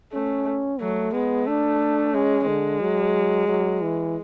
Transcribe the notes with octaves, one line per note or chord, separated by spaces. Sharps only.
A3 C#4
F#3 A3
G#3 B3
A3 D4
G#3 C#4
D3 G#3
F#3
F#3
E3